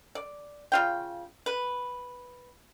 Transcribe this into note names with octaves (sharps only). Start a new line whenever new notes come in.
D5
C#3 F4 G5
B4